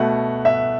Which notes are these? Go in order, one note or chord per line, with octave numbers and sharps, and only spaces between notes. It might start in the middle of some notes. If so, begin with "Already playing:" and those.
Already playing: B2 A3 F#5
E5